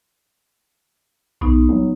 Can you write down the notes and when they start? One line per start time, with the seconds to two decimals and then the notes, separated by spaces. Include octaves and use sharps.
1.41 B1 A2 B3 D#4
1.69 F#3